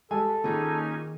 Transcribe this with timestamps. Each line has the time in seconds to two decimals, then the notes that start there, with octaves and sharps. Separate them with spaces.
0.11 G3 G#3 A4 G#5
0.44 A#2 D#3 C#4 D#4 G#4 G#5